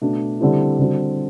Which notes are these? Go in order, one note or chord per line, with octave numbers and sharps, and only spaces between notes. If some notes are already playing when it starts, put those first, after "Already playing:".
B2 A3 D4
D3 G3 C4 E4 G4
D3 G3 C4 F#4